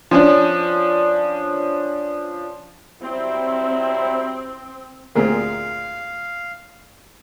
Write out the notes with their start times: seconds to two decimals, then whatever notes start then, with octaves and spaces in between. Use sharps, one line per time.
0.11 F3 C#4 D4
3.03 F#3 G3 C4 E4
5.16 D2 A#2 C4 G#4 A#4 F5